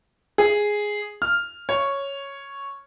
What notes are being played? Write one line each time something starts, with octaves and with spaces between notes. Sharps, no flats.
G#4
F6
C#5